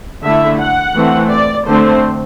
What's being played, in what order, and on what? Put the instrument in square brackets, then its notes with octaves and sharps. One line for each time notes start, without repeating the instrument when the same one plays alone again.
[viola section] D3 A3 E4 E5
F#5
E3 A3 C4
D5
D3 A3 C4 C5